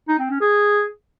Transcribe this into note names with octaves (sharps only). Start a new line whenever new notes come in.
D#4
C4
C#4
G#4